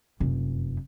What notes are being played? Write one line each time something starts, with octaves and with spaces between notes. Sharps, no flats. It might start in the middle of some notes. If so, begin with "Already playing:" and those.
F1 F#2